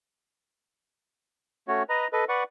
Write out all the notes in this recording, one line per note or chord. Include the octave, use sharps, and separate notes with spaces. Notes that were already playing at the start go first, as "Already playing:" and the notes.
A3 C#4 F#4 C#5
B4 D#5 A#5
A4 B4 D#5
B4 D5 F#5 C#6